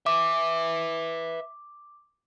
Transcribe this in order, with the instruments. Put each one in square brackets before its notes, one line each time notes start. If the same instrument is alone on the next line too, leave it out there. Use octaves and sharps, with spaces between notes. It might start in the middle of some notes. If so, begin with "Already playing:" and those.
[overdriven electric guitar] B4 E5 [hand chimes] D6